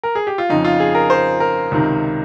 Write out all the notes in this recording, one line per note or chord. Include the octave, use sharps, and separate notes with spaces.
A#4
G#4
G4
F4
F2 C#3 F3 D#4
F4
G#4
A#4
C5
A#4
C#2 C3 D#3